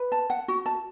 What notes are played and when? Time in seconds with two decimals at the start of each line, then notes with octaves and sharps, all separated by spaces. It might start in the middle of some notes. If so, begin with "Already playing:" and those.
Already playing: B4
0.12 A5
0.30 F#5
0.48 F#4
0.66 A5